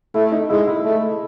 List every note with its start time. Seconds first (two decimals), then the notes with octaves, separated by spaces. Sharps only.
0.14 A3 E4
0.32 D#4
0.49 G#3 E4
0.67 E4
0.85 A3